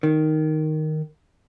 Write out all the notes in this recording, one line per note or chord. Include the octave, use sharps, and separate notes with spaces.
D#3